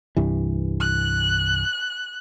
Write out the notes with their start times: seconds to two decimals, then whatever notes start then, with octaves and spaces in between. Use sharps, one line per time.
0.16 C2 G2 E3
0.81 F#6